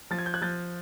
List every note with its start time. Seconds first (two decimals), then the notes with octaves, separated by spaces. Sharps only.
0.11 F3 A6
0.19 G#6
0.26 G6
0.34 F#6 G#6
0.42 F3 G6 A6